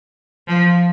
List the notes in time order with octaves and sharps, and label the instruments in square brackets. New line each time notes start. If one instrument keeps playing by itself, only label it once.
[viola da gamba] F3